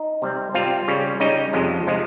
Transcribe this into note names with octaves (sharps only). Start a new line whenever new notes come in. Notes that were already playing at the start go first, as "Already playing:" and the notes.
Already playing: D#4 D#5
C3 G3 C4
C3 G3 C4 F4 F5
C#3 G3 C#4
C#3 G3 C#4 D#4 D#5
F2 C3 F3 G#3
C3 F3 G#3